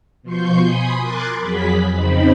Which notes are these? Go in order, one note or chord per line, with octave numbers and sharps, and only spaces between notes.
B2 F3 C6 C#6 G6
G#5 B5 C6 D#6
A#4 C6 D6 F#6 G#6 A6
F2 F#3 G#4 B5 B6
F2 C#3 C4 D#4 B5